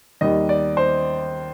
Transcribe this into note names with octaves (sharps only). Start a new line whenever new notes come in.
D#2 D#3 G3 D#5
D5
C5